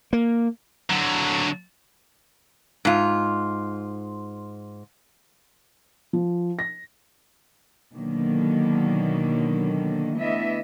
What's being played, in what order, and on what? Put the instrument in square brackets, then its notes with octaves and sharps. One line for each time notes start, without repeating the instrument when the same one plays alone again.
[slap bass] A#3
[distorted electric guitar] D3 F#3
[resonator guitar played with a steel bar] G#2 F4
[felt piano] F3
A#6
[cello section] B2 D3 D#3 F#3 A#3
D3 E3 A3 B3 D#5 E5